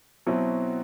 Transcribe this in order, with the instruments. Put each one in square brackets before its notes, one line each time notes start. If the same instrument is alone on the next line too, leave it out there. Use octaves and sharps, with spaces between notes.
[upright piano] B2 F#3 C4 E4